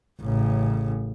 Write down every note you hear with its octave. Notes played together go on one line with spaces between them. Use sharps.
A1 C#3